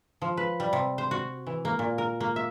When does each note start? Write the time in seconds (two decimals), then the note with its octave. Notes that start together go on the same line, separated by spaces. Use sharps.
0.22 F3
0.37 B4
0.60 G3
0.73 C3
0.98 C5
1.11 F#4
1.47 E3
1.65 A#3
1.79 A#2
1.98 A#4
2.20 A#3
2.36 E5